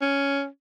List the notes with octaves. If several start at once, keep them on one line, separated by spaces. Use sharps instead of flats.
C#4